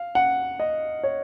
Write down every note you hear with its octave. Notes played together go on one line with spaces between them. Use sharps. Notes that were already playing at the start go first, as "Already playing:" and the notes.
Already playing: F5
F#5
D#5
C#5